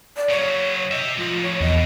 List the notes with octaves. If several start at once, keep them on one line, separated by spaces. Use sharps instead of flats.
D5
C#3 F#3 C#5
G4 D#5 E5
A2 F3 F4
C#5
E2 B2 D#5